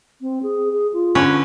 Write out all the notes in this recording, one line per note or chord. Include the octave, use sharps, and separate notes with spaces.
C4
G#4
G#4
F4
D3 C#4 B4